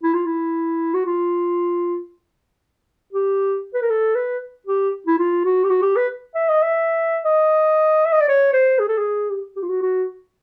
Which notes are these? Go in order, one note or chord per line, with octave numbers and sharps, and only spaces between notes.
E4
F4
E4
F#4
F4
G4
B4
A#4
A4
B4
G4
E4
F4
F#4
G4
F#4
G4
B4
E5
D#5
E5
D#5
E5
D#5
D5
C#5
C5
G#4
A4
G#4
G4
G4
F4
F#4
F#4